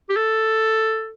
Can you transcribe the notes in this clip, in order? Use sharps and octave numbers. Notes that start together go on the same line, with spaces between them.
G4
A4